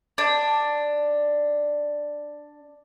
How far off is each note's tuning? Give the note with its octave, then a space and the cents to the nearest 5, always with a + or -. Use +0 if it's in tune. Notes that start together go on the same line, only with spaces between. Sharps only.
D4 +5